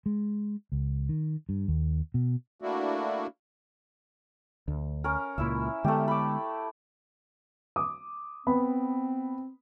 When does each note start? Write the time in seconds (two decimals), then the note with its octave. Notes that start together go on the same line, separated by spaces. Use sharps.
0.06 G#3
0.72 C#2
1.09 D#3
1.49 G2
1.68 D#2
2.14 B2
2.62 A3 A#3 D4 E4 F#4
4.68 D2
5.04 C#4 A#4
5.38 C#2 A#2 E4 E5
5.84 D3 G#3 A3 B3 G4
6.08 B5 D6
7.76 D6 D#6
8.47 B3 C4 B5